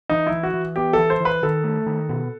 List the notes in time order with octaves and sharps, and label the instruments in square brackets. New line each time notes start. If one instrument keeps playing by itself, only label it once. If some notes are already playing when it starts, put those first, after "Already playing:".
[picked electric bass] E3 [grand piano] D#4
[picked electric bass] E3 [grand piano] E4
[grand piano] F#4
[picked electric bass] E3
[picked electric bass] B3 [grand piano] G4
[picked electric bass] E3 [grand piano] A4
[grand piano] C5
[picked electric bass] E3 [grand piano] B4
[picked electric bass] D#3 [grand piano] A4
[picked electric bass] A3
D#3
B2